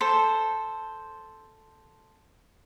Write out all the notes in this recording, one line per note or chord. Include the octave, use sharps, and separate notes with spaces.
A4 C5